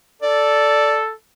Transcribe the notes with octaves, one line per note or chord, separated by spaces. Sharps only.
A4 D5